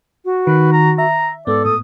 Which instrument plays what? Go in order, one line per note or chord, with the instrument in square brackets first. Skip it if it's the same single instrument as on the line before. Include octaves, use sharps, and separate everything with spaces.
[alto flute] F#4
[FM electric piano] D#3 [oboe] B4
[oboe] A#5
[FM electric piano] E5 [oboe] A#5
[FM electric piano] G#2 B3 [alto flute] A4 [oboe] D5
[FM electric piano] A2 [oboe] D#6